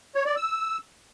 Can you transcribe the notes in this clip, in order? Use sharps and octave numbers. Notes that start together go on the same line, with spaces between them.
C#5
D5
E6